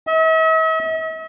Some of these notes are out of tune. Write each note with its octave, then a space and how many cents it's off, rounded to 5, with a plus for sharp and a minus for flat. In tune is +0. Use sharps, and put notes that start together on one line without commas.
E5 -45